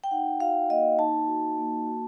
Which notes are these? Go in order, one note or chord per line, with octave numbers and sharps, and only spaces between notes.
G5
D#4 F#5
F#4 F5
A#3 D#5
D#4 A5
F#4
A#3
F#4